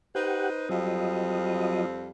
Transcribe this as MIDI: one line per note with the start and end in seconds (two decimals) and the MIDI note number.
0.15 0.67 63
0.15 0.50 67
0.15 0.67 71
0.15 0.67 72
0.15 0.50 78
0.69 2.08 41
0.69 1.86 54
0.69 2.08 55
0.69 2.08 60
0.69 1.86 65
0.69 1.86 75